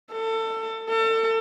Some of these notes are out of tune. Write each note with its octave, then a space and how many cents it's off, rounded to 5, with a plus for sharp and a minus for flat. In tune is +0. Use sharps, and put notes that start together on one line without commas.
A4 +25
A4 +35